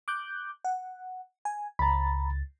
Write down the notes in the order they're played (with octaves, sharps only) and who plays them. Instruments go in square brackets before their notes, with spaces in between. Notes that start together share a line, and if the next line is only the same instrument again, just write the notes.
[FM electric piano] D6 F#6 G6
F#5
G#5
[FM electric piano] C#2 A6 [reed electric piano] A#5 B5